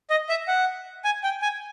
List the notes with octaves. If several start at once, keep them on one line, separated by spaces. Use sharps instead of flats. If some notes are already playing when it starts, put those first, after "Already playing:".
D#5
E5
F#5
G#5
G5
G#5